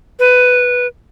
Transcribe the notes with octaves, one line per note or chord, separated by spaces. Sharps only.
B4